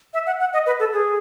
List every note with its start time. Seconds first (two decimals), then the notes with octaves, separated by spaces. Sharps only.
0.13 E5
0.26 F#5
0.40 F#5
0.53 D#5
0.66 B4
0.79 A4
0.93 G#4